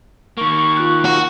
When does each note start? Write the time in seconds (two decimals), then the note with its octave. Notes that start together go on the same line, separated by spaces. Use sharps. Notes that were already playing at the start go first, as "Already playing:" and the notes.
0.37 D#3 A#3 C#6
0.77 F4 F#6
1.05 F#4